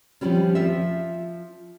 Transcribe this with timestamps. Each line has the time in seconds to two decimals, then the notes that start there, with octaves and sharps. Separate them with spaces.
0.21 C3 D#3 F3 G3 C#4
0.55 F3 F4 E5